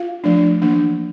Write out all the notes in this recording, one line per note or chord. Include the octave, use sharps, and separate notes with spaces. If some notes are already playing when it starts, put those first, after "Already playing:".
Already playing: F4 F5
F3 A3 D4
E3 A#3 D4